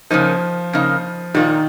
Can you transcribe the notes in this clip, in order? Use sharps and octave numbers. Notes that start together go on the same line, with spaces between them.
C#3 F3 A#3 D#4
C#3 A#3 D#4
A#2 D#3 A#3 F4